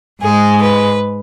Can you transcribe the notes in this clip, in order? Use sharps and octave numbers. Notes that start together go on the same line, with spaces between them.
G#2 G#3 G#4
B4